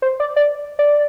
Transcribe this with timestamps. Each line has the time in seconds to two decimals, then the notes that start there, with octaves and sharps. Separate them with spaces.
0.02 C5
0.20 D5
0.36 D5
0.79 D5